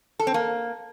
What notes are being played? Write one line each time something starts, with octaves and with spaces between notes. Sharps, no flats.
A4
C4
A#3